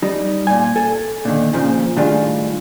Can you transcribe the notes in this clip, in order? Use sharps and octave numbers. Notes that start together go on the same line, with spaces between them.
G3 D#4
A#2 G#5
A4 G#5
A#2 D3 D#3
A#2 C#3 F3
A2 D#3 G3 G#3 D4 F4